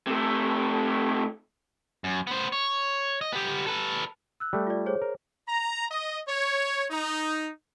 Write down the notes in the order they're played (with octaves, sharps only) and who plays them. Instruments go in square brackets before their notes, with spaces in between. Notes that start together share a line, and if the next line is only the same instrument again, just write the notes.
[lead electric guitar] C3 A3
[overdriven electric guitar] F#2
B3 C5
C#5
D#5
B3 G4
A4 B4
[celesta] E6 F#6
[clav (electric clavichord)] G3 A3
[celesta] F4 D5
G#4 C5 C#5
[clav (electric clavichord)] A#4
[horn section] A#5
D#5
C#5
D#4